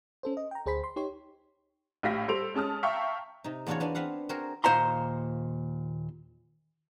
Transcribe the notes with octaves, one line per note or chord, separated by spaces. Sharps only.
C#4 A4 C5
D#5
G5 A#5
D2 G#4 C5 B5 B6
C6
D#4 G4 C#5 C6
A#1 A2 G4 F5 A#6 B6
G3 A4 C5 C6 D7 F7
G#3 C#4 A5 D#6 F6
E5 F5 G5 A5 A#5 C#6
C3 D#4
E2 B3 D4 F4 F#4 C#5
B3 D4 C5 G#5
B3 C4 B4 F5 F#5
C4 F#4 G#4 A#4 C5
D#2 A#2 C5 F#5 A#5 C6